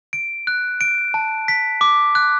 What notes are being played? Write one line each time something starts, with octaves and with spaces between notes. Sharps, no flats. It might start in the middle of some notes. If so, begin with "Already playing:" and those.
D7
F#6
D7
A5
B6
D6
F#6